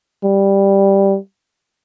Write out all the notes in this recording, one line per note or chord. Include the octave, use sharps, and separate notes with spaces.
G3